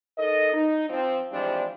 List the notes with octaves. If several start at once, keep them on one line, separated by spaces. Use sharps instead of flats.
D#4 A4 A#4 D#5
D#4
F3 C4
E3 F3 G3 G#3 C4 D4